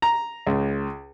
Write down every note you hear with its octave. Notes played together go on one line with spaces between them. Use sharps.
A#5
C#2